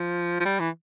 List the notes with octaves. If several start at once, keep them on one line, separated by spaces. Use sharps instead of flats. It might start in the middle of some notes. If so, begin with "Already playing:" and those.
Already playing: F3
F3
G3
E3